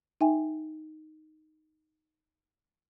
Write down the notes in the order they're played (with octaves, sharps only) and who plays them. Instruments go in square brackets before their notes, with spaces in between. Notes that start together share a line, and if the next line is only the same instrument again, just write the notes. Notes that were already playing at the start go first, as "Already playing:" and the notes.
[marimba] D#4 E5 G5 G#5